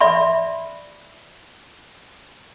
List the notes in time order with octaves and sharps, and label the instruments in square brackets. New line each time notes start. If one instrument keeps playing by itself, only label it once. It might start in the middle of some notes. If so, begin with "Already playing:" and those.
[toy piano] D5 E5 B5 C6